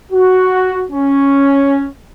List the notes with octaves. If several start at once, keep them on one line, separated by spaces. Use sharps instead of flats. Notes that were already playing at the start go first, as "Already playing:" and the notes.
F#4
C#4